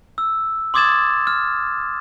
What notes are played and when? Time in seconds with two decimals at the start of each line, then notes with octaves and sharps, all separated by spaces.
0.18 E6
0.74 C6 D6 D#6 G#6 A6 E7
1.27 F6